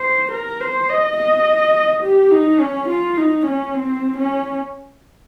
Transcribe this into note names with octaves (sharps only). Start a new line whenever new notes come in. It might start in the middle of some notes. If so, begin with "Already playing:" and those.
Already playing: C5
A#4
C5
D#5
D#5
G4
D#4
C#4
F4
D#4
C#4
C4
C#4